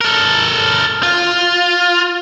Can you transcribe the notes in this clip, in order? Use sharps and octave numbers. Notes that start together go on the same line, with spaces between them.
A4 A#4
F4